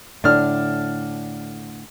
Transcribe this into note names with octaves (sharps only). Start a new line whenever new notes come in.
A2 D3 D4 F6